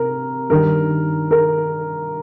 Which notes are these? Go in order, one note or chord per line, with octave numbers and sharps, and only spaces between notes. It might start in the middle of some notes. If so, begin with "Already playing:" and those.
Already playing: C3 A#4
G2 D#3 G3 A#4
A#4